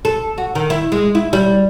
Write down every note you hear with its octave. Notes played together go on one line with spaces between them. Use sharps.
A4
F#4
D#3
E4
G#3
E4
G3